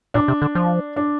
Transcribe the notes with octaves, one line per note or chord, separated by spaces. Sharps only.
A#2 D4
C3
D3
F3
D4